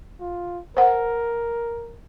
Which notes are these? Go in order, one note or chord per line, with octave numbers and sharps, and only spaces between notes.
F4
A#4 C5 F#5